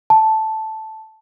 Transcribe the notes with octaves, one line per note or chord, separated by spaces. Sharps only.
A5